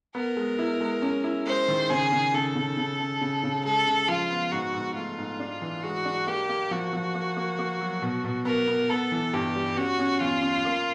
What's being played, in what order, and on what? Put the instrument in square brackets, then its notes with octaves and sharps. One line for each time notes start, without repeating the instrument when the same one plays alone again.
[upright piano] B3 [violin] A#4
[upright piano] G#3
E4
G#3
C#4
E4
[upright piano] G#3 [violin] C5
[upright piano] D#3
[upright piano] C#3 [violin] G#4
[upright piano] C#3
[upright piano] C#3 [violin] A4
[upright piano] C#3
C#3
C#3
C#3
C#3
[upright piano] G#3 [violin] A4
[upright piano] C#3
[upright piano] F3 [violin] F4
[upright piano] B3
[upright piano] G#2 [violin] F#4
[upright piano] G#2
[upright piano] A3 [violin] F4
[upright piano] G#2
D4
E3
[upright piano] G#3 [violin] F#4
[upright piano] D4
[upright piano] A#3 [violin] G4
[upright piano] A#3
[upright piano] F3 [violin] F#4
[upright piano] F3
A#3
A#3
A#3
F#3
B2
B2
[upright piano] B3 [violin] A#4
[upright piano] B3
[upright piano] B3 [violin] A4
[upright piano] E3
[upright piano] G2 [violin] G4
[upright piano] G3
[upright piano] C#4 [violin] F#4
[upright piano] C#4
[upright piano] E2 [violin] F4
[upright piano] C#4
A#3